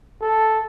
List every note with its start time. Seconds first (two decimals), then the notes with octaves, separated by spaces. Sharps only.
0.21 A4